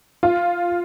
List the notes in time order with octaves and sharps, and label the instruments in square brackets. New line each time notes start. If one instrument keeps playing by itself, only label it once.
[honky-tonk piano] F4